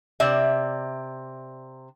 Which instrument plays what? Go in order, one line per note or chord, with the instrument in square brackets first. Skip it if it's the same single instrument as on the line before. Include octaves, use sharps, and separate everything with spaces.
[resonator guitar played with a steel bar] C3 D5 E5